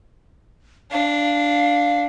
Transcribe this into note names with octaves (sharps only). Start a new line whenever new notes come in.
D4 F5